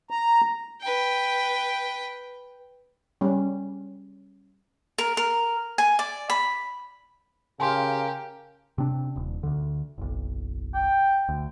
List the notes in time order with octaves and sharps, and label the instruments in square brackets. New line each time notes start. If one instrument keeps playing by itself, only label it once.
[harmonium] A#5
[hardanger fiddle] B4 G5
[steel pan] G3 C#4
[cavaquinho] A#4
A#4
G#5
D5
B5
[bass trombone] C#3 [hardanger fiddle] G4 [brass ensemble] A#4 F5 [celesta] G#5 A5 C6
[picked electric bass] C3 C4 D4
D#1
D2 D3
F#1 B1
[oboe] G5
[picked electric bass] D2